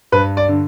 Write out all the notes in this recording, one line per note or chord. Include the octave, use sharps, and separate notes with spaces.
G2 B4
D5
D3